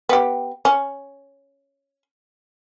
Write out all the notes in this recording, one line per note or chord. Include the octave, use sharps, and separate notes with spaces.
B3 G4
C#4